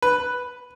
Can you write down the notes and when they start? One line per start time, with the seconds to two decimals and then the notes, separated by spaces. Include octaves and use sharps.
0.02 B4